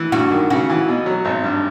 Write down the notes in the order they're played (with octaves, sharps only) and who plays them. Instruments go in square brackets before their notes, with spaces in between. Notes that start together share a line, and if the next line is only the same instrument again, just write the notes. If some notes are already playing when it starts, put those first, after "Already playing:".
Already playing: [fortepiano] E3
[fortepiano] G2 [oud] F#4
[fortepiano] D#3
[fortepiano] C#3 [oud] F#4
[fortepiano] E3
B2
F#3
G#1
G2